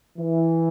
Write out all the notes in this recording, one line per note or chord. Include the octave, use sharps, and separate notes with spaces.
E3